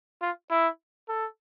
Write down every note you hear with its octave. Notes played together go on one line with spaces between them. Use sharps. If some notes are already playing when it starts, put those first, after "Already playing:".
F4
E4
A4